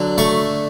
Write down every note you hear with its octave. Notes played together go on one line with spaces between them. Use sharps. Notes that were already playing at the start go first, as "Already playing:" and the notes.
Already playing: D3 F#3
A3 C#6